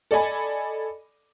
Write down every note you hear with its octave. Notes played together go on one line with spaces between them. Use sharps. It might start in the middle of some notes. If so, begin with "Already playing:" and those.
A4 D5 D#5 G#5 B5